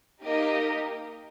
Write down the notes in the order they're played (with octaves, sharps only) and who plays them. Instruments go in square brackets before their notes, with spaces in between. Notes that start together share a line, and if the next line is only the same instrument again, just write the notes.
[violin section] A#3 D#4 G4 A#4 D#5